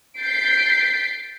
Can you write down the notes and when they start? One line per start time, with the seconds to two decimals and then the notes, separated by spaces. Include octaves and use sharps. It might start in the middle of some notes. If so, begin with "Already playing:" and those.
0.19 G6 A6 B6 C7 D7